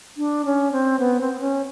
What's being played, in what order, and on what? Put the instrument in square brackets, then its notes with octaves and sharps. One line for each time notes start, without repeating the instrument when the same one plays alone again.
[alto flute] D4
C#4
C4
B3
C4
C4
C#4